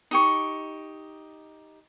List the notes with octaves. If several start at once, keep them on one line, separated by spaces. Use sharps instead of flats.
D#4 G4 C#6